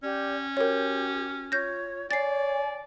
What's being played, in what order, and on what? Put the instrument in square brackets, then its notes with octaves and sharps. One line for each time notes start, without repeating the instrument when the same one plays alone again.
[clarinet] C#4 [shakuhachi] G4 [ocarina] D5
[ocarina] F#4 [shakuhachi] G4 [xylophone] A#4 C#5
[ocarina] F4 [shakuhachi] C#5 [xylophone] G6 A#6
[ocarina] C#5 [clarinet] D5 [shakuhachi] G#5 [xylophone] A6 C7